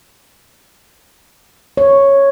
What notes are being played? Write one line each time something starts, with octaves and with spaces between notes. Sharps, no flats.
C#5